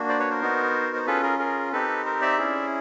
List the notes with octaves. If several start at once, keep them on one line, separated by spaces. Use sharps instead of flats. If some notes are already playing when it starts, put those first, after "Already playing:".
Already playing: A#3 D4 F#4
C5 D5
B4 C#5
A#4 C5
B3 D#4 F#4
C5
C#4 F4 G#4 A4 B4
G#4 A#4
G#4 A#4
C4 D#4 G4 A4 B4
A#4 C5
D5 E5
C#4 E4 G#4